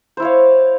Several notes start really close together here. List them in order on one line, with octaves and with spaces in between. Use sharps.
C5 E4 C#5 F5